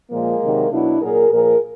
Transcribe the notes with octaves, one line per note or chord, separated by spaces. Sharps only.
A#2 F3 G#3 A#3
C3 D#3 F#3
B2 F#3 D4 E4
A#2 F#3 G#4 A#4
A#2 F3 G#4 A#4